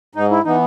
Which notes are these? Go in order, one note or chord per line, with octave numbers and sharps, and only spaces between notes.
G#2 D#4
E4
E3 B3 D#4